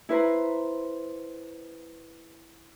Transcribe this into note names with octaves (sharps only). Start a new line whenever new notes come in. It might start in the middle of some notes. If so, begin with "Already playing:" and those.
E4 B4 C5 A#5